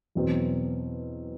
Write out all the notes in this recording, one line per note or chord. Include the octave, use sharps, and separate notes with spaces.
E2 B2 F#3 C4